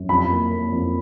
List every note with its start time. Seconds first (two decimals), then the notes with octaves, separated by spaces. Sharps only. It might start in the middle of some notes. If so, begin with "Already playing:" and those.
Already playing: F#2
0.09 F2 B5
0.30 A#3
0.50 A#3
0.72 F2